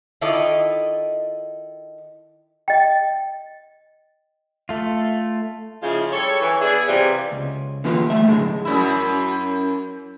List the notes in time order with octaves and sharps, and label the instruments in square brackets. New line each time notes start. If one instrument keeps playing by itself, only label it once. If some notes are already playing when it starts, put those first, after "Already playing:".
[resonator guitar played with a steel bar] D#3 E4 F4 A4 D5 D#5
[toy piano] D#5 G5
[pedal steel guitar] A3 F4
[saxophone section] C#3 F3 G#3 E4 F4
G3 A4 C#5
E3
B3 D4 E4 G#4
C3 E3 G3 F4
[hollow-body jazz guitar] C#2
D3 E3 A#3 F4 G4 B4
D2 G3 A3 E5
F#2 A2 D3 G#3
[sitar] F#2 E4